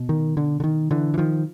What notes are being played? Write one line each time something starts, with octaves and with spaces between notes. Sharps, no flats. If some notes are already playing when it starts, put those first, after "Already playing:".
Already playing: B2
D#3
D3
D3
D#3
D3 E3
E3
D#3 F3